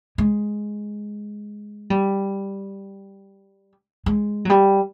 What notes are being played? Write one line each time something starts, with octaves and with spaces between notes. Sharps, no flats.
G#3
G3
G#3
F#3
G3